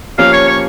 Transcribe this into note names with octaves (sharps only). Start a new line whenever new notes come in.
F3 A#3 C#4 G4 F5
C#5
C#5